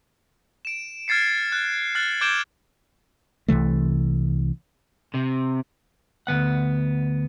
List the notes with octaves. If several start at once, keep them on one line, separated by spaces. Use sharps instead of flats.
D7 E7
F6 G#6 A6 C7 C#7
F#6
F6 F#6 A6 F#7
D6 G6 G#6 D7 E7 G7
C2 C3 E3 A3
C3
D2 C#3 B3 F#5